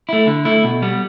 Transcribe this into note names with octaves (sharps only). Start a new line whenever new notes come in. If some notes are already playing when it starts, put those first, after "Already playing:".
A3 E4
D3
A3 E4
B2
G3 B3